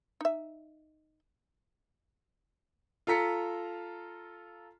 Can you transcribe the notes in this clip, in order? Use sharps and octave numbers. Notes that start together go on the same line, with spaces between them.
D#4 E5
F4 A4 A#5 B6 C#7